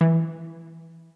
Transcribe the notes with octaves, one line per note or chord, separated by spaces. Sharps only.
E3